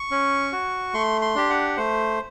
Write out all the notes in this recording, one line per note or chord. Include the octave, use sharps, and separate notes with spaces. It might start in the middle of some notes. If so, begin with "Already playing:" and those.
Already playing: C#6
C#4
F#4
A3 C6
C6
D4 G4
F#5
A3 C5